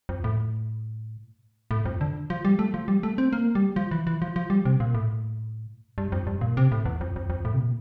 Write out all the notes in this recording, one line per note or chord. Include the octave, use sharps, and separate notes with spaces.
F2
A2
A2
F2
D3
F3
G3
A3
F3
G3
A3
C4
A#3
G3
F3
E3
E3
F3
F3
G3
C3
A#2
A2
G2
F2
G2
A#2
C3
A2
E2
F2
F2
F2
A2
C3
A#2